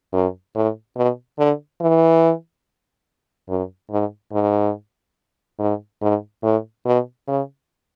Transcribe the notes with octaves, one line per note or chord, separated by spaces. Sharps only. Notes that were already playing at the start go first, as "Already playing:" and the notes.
F#2
A2
B2
D3
E3
F#2
G#2
G#2
G#2
G#2
A2
B2
C#3